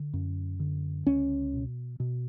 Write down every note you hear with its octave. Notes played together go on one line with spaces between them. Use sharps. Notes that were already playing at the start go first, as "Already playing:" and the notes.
Already playing: D3
F#2
D3
C#2 C#4
B2
B2